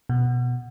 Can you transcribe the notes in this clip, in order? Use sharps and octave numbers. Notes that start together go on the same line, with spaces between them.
B2